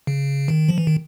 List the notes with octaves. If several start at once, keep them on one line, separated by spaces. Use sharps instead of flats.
C#3
D#3
F3
E3
D#3